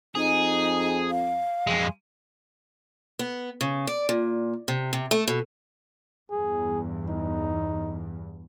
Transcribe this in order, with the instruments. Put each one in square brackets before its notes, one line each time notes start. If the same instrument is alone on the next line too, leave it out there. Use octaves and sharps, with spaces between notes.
[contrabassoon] F2 [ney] D#4 [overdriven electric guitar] G#4
[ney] F5
[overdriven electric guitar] F2 G#3
[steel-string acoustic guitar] B3
C#3
D5
A#2
C3
C3
A3
B2
[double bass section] E2 G2 [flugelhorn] G#4
[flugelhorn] D#4